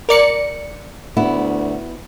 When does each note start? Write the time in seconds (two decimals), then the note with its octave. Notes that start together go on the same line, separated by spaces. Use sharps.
0.09 A#4 D5 C#7
1.17 D2 B3 E4